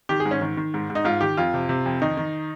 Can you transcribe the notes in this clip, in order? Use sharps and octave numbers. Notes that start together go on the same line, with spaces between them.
D#3 G4
G#4
G#2
C#4
D#3
D#3
G#2
G#2
D#4
G#2 F4
D#3 G4
F2 F4
C3
C3
F2
D#3 D#4
D#3